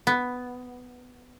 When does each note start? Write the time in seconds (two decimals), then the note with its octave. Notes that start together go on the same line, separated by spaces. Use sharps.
0.07 B3